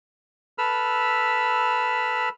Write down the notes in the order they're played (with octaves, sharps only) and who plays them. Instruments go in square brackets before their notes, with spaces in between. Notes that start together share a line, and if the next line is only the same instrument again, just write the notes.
[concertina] A4 B4 B5 E6 F6